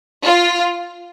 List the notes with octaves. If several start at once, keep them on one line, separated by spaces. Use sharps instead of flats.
F4